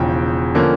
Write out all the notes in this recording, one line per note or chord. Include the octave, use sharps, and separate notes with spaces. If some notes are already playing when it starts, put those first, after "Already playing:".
Already playing: E1 E2 C#3 F3 G5
D3 F3 A#3 C#4